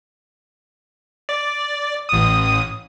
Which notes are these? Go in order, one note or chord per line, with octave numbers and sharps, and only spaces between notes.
D5
A1 D#6